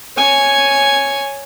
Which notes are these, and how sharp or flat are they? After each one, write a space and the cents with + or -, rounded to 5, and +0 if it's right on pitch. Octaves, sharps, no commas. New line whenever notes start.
C#5 +0 G#5 +0